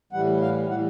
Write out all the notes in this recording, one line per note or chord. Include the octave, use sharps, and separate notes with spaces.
A2 E3 G3 F#5
F5
A2 E3 G3 F#5